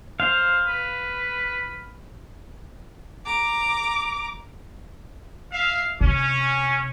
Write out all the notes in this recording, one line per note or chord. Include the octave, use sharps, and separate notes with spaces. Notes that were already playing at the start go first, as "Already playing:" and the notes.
C5 F5
B4
A#5 D6
E5 F5
C3 C#4